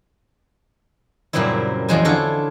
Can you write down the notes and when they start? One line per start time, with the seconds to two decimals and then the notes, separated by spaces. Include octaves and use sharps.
1.33 F#2 A#2 C#3 G3 C4 E4
1.89 E2 F3 F#3 G#3 C5 G#5
2.05 D3 E4 F4 A4 C#5